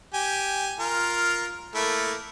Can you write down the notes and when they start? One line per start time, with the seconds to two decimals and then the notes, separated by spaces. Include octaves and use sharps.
0.14 G4 G#5
0.80 F4 A#4
1.75 A3 A#3 E4